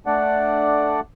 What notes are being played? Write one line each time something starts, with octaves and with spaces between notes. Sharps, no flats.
A3 D4 D5 F#5